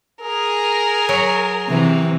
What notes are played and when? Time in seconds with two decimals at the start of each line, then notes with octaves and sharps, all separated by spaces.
0.22 G#4 A#4
1.09 F#3
1.68 C3 E3